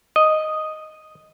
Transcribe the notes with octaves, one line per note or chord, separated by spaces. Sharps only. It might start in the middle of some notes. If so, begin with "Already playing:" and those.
D#5